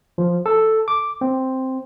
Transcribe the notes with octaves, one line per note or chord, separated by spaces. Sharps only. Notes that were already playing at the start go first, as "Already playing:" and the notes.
F3
A4
D6
C4